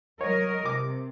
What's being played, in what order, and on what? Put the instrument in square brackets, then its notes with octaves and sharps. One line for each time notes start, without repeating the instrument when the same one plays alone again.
[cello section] F#3 A#4 D#5 [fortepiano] C#5
[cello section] C3 [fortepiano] D6